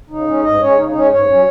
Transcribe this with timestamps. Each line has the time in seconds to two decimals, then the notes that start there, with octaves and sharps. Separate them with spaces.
0.10 C#3 D#4
0.27 G#3 C#4
0.43 G#2 D#5
0.60 G#3 C#4 C#5
0.76 C#3 D#4
0.89 D#4
0.94 G#3 C#4 C#5
1.10 G#2 C#5
1.28 F#3 C#4